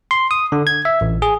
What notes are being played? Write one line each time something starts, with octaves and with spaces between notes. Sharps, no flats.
C6
D#6
D3
G#6
E5
A1
G#4